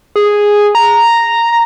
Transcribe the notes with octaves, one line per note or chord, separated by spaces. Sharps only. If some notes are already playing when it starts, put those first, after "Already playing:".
G#4
A#5